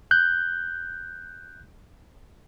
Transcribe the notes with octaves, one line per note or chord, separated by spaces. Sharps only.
F#6 G6